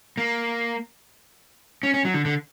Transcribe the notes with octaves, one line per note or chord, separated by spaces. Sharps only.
A#3
C#4
C#4
F#3
D3
D3